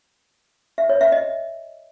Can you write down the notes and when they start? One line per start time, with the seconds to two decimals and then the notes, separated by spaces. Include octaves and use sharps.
0.78 E5
0.89 C#5
1.01 E5
1.12 D#5